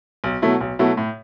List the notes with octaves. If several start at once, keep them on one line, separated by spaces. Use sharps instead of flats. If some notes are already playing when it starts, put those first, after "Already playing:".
B1
B2 F#3 A3 E4
B1
B2 F#3 A3 E4
A2